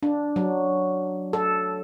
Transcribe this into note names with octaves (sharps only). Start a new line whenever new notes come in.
D4
F#3
A4